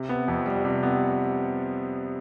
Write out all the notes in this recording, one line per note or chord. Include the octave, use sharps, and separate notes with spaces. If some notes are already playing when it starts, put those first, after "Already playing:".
Already playing: C3
B3
F2
G3
C3
B3